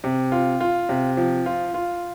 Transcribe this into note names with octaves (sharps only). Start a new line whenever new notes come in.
C3
F4
F4
C3
F3
F4
F4